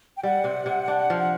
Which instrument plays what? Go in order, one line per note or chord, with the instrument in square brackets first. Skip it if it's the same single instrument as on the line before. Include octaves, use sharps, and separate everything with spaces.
[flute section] G5
[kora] G3 [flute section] F#5
[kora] C3
C3
D4
F3